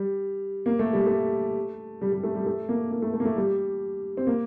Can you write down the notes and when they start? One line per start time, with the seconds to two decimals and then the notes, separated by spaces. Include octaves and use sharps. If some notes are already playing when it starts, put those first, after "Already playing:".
Already playing: G3
0.66 A#3
0.79 A3
0.93 G3
1.06 A3
2.02 G3
2.13 G3
2.24 A3
2.35 G3
2.46 A3
2.69 A#3
2.91 A#3
3.02 A3
3.14 A3
3.20 A#3
3.25 A3
3.37 G3
4.17 C4
4.27 A#3